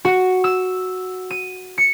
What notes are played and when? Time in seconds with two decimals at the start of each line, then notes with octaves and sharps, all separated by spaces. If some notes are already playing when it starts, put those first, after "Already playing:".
0.05 F#4
0.44 E6
1.31 D#7
1.78 C#7